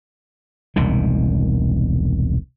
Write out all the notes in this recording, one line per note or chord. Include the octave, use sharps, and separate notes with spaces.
E1 C2 A#2 D#3